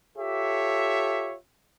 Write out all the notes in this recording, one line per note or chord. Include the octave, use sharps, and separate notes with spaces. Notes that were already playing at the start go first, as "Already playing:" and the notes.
F4 G4 A4 C#5 E5